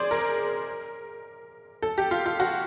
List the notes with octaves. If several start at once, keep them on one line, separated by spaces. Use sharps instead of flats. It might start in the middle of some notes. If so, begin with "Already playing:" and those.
Already playing: G#4 C5 D5
A#4
A4
G4
F4
F4
F#4